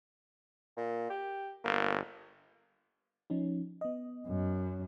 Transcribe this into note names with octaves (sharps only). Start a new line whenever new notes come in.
A#2
G4
G1 A#3
F3 C#4 D#4
B3 D#5
F#2